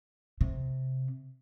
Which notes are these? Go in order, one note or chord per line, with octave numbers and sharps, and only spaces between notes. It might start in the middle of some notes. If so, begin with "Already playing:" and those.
C3